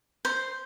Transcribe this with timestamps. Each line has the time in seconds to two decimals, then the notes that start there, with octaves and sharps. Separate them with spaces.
0.25 C5